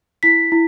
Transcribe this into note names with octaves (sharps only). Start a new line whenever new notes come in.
E4 B6
E4